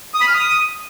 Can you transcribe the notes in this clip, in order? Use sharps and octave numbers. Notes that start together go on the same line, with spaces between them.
D#6
B5
F6
D#6